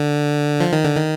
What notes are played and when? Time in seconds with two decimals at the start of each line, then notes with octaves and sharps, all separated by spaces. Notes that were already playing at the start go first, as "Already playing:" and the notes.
Already playing: D3
0.60 F3
0.72 D#3
0.84 D3
0.96 D#3